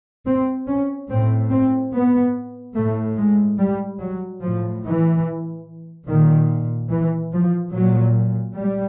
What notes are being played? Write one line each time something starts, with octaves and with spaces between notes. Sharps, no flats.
C4
C#4
A2 C4
C4
B3
A2 A3
G#3
G3
F#3
A2 F3
E3
A#2 D#3
E3
F3
A#2 F#3
G3